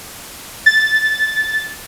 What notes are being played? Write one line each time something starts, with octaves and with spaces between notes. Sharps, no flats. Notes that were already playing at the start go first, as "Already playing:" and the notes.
A6